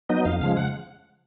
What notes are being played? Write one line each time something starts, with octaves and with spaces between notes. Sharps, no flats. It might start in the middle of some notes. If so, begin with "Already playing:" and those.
F#3 B3 D#4 D#5
F2 F5
C#3 F3 G#3 F5
F#5